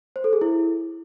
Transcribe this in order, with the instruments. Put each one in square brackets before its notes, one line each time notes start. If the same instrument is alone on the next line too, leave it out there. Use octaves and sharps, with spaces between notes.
[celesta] C5
A4
G#4
E4